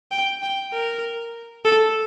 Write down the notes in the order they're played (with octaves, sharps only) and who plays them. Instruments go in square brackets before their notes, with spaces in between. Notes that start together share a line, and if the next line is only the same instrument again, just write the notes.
[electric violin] G5
G5
A#4
A4